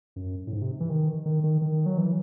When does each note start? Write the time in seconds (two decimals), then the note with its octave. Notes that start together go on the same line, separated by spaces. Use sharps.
0.16 F#2
0.47 A2
0.53 G#2
0.62 C3
0.80 E3
0.89 D#3
1.26 D#3
1.44 D#3
1.62 D#3
1.86 F#3
1.98 E3